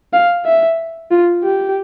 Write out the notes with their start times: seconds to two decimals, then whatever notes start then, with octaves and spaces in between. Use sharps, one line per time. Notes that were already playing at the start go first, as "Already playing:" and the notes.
0.13 F5
0.45 E5
1.11 F4
1.43 G4